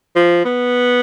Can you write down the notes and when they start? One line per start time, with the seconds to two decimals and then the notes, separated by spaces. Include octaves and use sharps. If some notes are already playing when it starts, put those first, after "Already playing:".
0.16 F3
0.45 B3